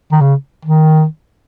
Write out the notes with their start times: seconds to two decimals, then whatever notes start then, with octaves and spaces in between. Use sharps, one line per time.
0.12 D#3
0.21 C#3
0.65 D#3